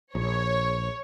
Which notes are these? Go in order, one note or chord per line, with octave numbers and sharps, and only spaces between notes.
A#1 C#5